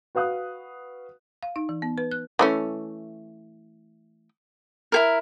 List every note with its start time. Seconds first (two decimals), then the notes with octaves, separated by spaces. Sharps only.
0.15 F#4 B4 F5 D#6 F#6
1.43 F5
1.56 D#4
1.69 E3
1.82 B3
1.98 B4
2.11 F#6
2.39 E3 A3 C#4
4.92 E4 G#4 A#4